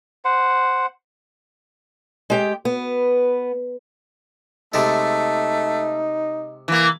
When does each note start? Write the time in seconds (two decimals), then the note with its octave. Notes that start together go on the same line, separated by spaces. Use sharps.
0.25 C5 F#5
2.30 G#3 G4 G5
2.65 B3 F#4 B4
4.74 C3 G#3 A3 D#4 A4
6.68 E3 A#3